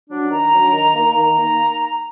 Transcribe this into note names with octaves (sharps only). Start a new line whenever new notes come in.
F#3 D4
D#3 A#5
F#3 D4
D#3
A#3 D#4
D#3 A#5
A#3 D#4